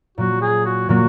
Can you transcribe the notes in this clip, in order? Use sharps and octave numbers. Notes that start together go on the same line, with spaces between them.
A#2 F#3 A#3 F#4
G#4
F#4
A#2 F#3 A#3 F#4